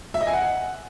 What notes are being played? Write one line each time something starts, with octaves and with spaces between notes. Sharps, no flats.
E5
D#5
G#5
F#5